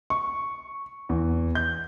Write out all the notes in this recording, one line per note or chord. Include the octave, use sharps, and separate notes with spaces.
C#6
E2
G6